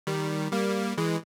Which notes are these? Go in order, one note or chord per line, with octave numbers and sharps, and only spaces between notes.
D#3 G3
G3 A#3
E3 G#3